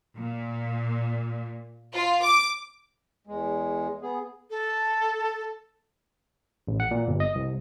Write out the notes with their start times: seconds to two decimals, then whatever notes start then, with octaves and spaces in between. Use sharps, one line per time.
0.17 A#2
1.93 F4
2.23 D6
3.27 E2 G#3
4.02 B3 G#4
4.50 A4
6.68 A1
6.80 F#5
6.91 A#2
7.07 G1
7.20 D#5
7.35 C2